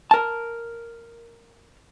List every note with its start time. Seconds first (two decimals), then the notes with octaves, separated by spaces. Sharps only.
0.11 A#4 A5